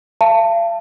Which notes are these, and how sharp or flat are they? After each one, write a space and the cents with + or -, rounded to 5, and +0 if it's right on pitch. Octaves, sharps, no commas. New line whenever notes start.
F5 -45 A5 +15